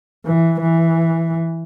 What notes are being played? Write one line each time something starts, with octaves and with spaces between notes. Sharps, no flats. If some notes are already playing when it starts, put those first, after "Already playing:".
E3
E3